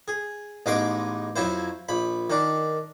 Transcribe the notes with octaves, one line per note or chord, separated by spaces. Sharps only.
G#4
A1 G#3 B3 D#4 C6 D6
F2 F#3 E4 C5
A#1 B5
D#3 D4